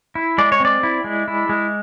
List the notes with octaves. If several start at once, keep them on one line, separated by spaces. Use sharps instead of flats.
E4
G#3 D5
C#5
C4 D5
E4
G#3
E4
G#3